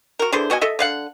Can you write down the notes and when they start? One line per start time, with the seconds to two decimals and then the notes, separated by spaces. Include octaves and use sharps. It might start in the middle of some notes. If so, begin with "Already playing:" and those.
0.19 F#4 A#4
0.32 D3 E3 G#4 C5
0.50 B2 F#4 D#5 G#5
0.61 A4 D#5 E5
0.79 D3 F5 F#5